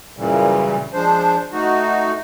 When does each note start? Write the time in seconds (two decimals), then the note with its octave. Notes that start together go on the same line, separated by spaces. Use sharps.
0.17 F#2 A#2 C#3 E3 G3
0.93 F3 G#3 D4 C5
1.52 A3 D#4 F#4